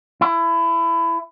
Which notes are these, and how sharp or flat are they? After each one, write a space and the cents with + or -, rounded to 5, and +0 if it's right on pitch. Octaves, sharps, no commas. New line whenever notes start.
E4 +25